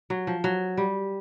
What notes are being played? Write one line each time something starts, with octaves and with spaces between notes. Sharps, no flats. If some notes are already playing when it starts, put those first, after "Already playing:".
F#3
F3
F#3
G3